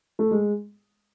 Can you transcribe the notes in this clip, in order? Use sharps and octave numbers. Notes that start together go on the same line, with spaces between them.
A3
G#3